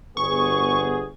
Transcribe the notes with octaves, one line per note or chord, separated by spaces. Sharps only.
G1 B3 G#4 C#6